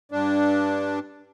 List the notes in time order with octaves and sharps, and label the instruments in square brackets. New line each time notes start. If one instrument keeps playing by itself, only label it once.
[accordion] G2 D4